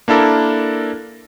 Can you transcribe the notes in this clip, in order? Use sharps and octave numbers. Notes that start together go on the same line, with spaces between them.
A#3 D4 E4 A4 A#4